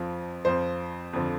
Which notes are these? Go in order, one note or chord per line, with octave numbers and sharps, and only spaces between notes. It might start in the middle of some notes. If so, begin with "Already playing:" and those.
Already playing: F2 F3
F2 F3 C5
F2 D3 F3